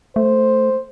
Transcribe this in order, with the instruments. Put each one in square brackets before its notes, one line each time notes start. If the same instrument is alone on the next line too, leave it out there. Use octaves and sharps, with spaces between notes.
[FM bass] A3 [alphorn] C5